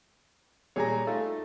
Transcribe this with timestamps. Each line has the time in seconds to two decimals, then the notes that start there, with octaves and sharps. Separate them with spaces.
0.76 A#2 G3 G#4 C#5 G#5 A#5
1.07 A3 D#4 F4 A4